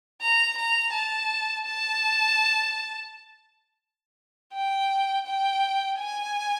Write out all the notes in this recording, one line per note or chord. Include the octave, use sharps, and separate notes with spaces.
A#5
A#5
A5
A5
G5
G5
G#5